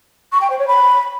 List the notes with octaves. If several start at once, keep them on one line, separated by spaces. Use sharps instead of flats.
C#6
G5
C5
C#5
B5